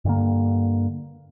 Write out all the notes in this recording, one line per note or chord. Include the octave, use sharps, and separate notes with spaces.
G2 D3 A#3